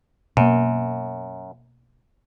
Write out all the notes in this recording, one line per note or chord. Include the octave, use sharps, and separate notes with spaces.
F#2 B2 A#3